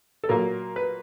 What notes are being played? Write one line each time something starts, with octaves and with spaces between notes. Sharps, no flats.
A4
A#2 F#3 A#3 A#4
B4